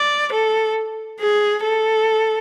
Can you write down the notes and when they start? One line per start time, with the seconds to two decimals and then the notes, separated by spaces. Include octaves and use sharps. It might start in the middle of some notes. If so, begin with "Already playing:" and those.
Already playing: D5
0.33 A4
1.20 G#4
1.64 A4